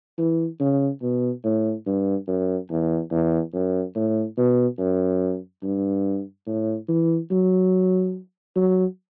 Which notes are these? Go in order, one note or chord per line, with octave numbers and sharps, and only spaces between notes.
E3
C#3
B2
A2
G2
F#2
E2
E2
F#2
A2
B2
F#2
G2
A2
E3
F#3
F#3